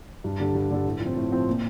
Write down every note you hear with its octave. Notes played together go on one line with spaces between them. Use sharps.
G2
D3 G3 D4 A4
G2
D3 G3 D4 A4
A2
F3
C4
A2
F3 C4
A#2